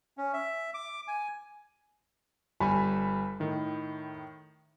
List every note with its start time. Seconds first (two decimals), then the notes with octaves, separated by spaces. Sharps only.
0.18 C#4
0.34 E5
0.74 D6
1.08 G#5
2.60 G1 G3 G#5 B5
3.40 A2 D#3